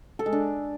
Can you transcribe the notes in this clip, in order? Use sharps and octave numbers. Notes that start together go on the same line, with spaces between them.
A4
G#3
D4